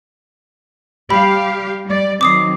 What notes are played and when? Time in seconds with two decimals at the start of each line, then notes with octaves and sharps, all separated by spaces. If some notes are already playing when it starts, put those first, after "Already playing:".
1.10 G3 G4 F5 B5
1.86 G3 D5
2.21 D#3 F#3 C4 D6 D#6 C7